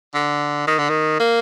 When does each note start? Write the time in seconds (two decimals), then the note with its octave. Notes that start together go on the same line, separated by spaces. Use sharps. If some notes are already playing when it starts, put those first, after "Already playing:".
0.14 D3
0.67 D#3
0.78 D3
0.90 D#3
1.20 A#3